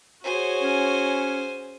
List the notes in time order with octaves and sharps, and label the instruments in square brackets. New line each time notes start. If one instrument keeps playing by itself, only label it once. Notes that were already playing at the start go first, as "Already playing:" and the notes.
[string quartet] F#4 G#4 C#5 [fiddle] C5 G#5
[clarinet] C#4